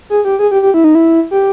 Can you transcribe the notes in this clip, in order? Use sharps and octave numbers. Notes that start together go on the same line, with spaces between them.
G#4
G4
G#4
G4
G4
E4
D#4
E4
G4